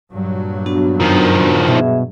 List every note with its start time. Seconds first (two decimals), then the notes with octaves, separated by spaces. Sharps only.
0.11 G2 A#2 F#3
0.66 B3 D4 F#4
1.00 F#2 D#3 F3
1.68 B2 G#4 E5